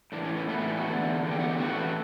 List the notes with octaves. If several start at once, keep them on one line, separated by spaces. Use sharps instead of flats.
A2 E3 D4
C#4
B3
A2 E3 B3
B3
G3
F#4
E2 D3
E2 D3
G4
F#4
G4
A2 E3 F#4